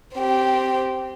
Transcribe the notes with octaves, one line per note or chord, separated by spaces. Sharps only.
C4 G4